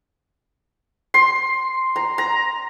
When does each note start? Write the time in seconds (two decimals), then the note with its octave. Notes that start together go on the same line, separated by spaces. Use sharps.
1.14 C6
1.96 A#5
2.18 A#5